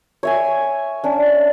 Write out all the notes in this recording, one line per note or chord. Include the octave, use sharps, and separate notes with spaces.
C#5 E5 G#5
C#4 D4